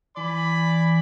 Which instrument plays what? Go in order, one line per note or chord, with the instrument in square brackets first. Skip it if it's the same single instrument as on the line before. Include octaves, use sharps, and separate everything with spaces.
[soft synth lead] E3 [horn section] D5 G#5 B5